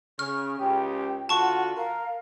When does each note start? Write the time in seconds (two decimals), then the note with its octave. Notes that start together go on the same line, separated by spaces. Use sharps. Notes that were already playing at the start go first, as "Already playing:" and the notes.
0.19 C#3 C#6 F6
0.60 C#2 C#3 G4 G5
1.29 D3 F4 F#4 F#5 A5 C#6
1.77 A#4 F5